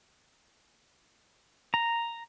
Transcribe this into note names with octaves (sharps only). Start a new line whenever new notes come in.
A#5